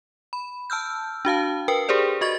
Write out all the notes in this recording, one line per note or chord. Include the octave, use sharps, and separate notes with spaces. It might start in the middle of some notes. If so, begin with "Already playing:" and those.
B5
A5 E6 F6 G6
D4 F#4 F5 A5
A#4 B4 G5
G4 G#4 A#4 C5 D5
F#4 D#5 C#6 A6